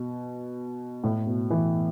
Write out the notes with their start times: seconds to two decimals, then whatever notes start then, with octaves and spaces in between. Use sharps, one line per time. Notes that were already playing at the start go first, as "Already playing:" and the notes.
Already playing: B2
1.04 A2
1.27 B2
1.50 E3